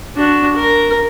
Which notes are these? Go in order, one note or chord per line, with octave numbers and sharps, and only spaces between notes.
D4 F#4
A#4